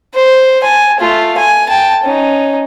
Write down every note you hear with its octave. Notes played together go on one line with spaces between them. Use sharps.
C5
G#5 A5
A3 F4
G#5
G5 A5
C#4 D#4